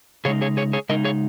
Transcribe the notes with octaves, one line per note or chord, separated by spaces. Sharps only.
C#3 G#3 D#4 G#4 C#5
G#4 C#5
G#4 C#5
G#4 C#5
C#3 G#3 D#4 A#4 D#5
G#4 C#5